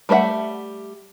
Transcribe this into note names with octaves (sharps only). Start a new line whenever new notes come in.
G3 A3 C5 E5 F#5